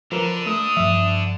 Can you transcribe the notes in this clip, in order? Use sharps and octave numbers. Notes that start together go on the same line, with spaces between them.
D3 F3 A#4 B4
A3 D#6
G2 F3 E5